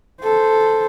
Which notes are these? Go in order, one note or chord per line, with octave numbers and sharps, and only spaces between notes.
A4 C5